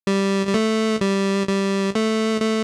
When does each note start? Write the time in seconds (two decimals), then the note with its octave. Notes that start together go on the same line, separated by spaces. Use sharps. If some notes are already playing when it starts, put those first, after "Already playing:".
0.07 G3
0.47 G3
0.54 A3
1.01 G3
1.48 G3
1.95 A3
2.41 A3